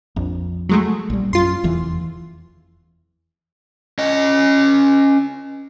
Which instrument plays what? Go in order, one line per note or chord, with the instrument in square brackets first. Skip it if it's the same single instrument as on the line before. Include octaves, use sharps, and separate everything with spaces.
[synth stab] A#1 [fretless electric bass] F2
[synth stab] F#3 G#3 A3
[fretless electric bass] A#1 G3
[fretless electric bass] F#2 [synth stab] F4 C6
[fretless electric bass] F1 E2 E3
[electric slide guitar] C#4 D#5